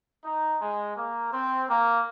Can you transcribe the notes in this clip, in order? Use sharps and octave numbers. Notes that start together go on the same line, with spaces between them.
D#4
G#3
A#3
C4
A#3